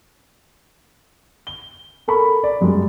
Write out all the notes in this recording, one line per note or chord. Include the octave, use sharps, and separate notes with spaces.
G7
A4 A#4 B5 C#6
D5
F#2 G3 G#3